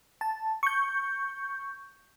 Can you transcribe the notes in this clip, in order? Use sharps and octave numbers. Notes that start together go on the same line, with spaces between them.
A5
C#6 G6